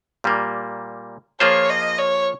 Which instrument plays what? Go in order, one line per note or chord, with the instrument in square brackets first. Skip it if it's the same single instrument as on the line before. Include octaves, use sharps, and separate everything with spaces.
[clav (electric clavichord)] A#2 G3 A#3
[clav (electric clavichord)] F3 A#3 F4 G#4 C5 [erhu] C#5
[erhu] D#5
C#5